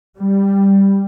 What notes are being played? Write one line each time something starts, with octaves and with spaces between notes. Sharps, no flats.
G3